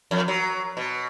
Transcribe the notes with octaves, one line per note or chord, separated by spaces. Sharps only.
F2
F#3
B2